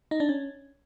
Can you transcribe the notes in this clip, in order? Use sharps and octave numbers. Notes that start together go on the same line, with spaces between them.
D#4
D4
C#4